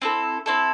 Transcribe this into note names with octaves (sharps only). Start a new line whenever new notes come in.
C4 E4 A4
C4 E4 A4